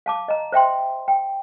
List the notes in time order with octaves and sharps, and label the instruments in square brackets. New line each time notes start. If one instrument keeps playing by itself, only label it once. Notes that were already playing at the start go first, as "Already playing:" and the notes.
[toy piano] F5 A5 D6
D#5 A#5
C5 E5 G5 C6
G5